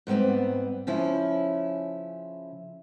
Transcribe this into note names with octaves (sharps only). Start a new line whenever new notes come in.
G#2 G3 B3 C4
C#3 F3 C#4 E4